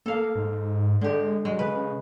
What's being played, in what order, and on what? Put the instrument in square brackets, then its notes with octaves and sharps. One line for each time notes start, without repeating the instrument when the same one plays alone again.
[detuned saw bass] A#3 [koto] A4 F5
[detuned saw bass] G#2
[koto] D3 G4 [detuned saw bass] G#3
[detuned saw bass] F#3 [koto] G#3
[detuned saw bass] C#3 [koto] B4